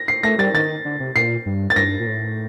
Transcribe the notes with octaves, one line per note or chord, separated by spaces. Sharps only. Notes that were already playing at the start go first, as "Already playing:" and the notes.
Already playing: A#6
C7
A3 A#6
G3 A6
D#3 A6
D3
C3
A#2 C7
G2
A6
G2 A#6
A#2
A2